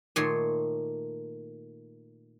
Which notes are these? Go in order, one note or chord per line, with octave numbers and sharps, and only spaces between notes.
A#2 D#3 A3 C#5 C6